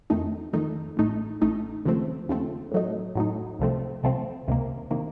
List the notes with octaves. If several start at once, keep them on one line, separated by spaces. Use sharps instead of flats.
F2 D#3 A3 D#4
F2 D#3 A3 D#4
A1 A2 A3 D#4
A1 A2 A3 D#4
D#2 C#3 F3 A3 C4
D#2 C#3 F3 A3 C4
A2 F#3 A3 D#4
A2 F#3 A3 D#4
C2 C3 F3 A3 C4
C2 C3 F3 A3 C4
C#2 C3 D#3 A#3
C3 D#3 A#3